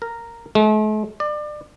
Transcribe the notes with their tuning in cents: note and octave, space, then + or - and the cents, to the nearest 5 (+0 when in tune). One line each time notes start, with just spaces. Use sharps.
A#4 -5
A3 -45
D5 +30